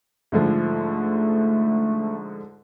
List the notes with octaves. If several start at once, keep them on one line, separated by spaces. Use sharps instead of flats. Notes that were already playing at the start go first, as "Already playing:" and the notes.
G#2 D3 F3 A3